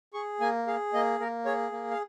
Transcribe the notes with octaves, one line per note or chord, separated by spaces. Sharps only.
G#4 C#6
A#3 G#5
G#4 F5
A#3 D#5
A#3 A#4
G#4 C#5
A#3
F5